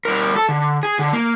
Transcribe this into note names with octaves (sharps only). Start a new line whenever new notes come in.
G3 A#4
A4
D3
G#4
D3
A#3